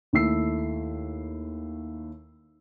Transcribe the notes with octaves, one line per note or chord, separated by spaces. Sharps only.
D#2 A3 E4 E6 C7